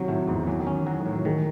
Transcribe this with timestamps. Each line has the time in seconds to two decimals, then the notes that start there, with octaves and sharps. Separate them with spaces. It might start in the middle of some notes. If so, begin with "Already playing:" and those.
Already playing: C3 D#3 F#3
0.08 A2 A3
0.28 E2 G#2
0.47 E3 F#3
0.60 D#3
0.67 C#4
0.86 F#3 F#4
0.99 D#3
1.06 A2
1.13 F#3
1.25 D#3 G#3